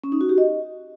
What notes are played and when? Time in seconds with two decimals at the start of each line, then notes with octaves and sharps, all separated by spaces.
0.04 C#4
0.12 D#4
0.21 F#4
0.29 G4
0.38 D#5